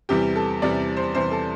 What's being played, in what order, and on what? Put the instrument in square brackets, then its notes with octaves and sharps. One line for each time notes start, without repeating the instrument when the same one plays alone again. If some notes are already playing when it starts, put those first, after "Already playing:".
[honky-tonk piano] E2 C3 E3 G3 G4
A4
E2 C3 E3 G3 D5
C5
E2 C3 E3 G3 C5
A4